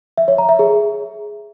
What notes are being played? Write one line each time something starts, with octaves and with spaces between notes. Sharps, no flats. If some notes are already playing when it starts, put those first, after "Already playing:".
E5
C#5
A#5
E5
G#4